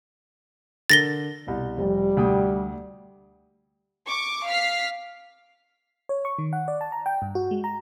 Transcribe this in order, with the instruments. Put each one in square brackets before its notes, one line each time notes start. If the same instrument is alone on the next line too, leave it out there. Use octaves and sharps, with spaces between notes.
[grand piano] D3 A#4 [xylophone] A6 A#6 G7
[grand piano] C2 B2
[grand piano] F1 [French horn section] G3
[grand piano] D2 G5 D#6
[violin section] C#6 D6
F5 F6 B6 C7
[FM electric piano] C#5
C#6
D#3
F#5
D5
A5
A#5
G5
G2
F#4
G#3
A#5